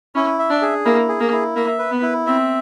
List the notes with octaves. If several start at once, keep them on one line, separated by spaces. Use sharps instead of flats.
C#4 E4
E5
D4
G#4
A#3 E4
G#4
A#3
E4
A#3 E5
B4
B3
E4
C4 E5